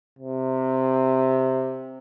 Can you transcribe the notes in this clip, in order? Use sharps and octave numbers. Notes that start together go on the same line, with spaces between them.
C3